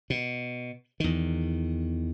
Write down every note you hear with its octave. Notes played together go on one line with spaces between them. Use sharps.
B2
E2 D#3